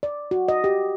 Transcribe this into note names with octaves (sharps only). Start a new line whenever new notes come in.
D5
F#4
D#5
G4